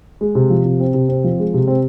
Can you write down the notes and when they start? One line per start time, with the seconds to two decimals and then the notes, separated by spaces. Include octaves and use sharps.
0.21 G#3
0.35 C3
0.50 F3
0.65 C3
0.80 C4
0.94 C3
1.09 C4
1.24 F3
1.39 G#3
1.54 C3
1.67 C4